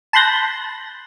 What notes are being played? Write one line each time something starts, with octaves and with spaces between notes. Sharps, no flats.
A5 B5 C6 F#6 G6 A#6